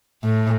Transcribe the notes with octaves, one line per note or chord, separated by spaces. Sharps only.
A2